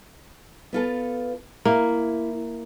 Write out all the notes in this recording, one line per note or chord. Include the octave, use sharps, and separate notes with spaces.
B3 F4 A4
A#3 E4